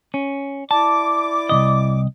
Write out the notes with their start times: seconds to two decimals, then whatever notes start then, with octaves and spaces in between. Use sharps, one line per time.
0.14 C#4
0.71 E4 D5 A5 D6
1.49 C2 B2 D#5